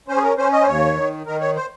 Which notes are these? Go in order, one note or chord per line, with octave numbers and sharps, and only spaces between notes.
C#4 C5
G#4
A#4
C#4 C5
D#5
C5
D#2 C#5
D#3
D#3 A#4
C#5
C5